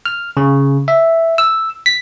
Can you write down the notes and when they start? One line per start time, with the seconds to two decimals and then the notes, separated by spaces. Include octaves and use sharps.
0.06 F6
0.37 C#3
0.88 E5
1.38 E6
1.86 B6